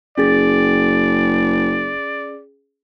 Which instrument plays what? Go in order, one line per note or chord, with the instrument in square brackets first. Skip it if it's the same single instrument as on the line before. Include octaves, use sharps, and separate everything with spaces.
[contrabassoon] F#1 [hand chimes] C#4 G#4 A6 [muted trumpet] D5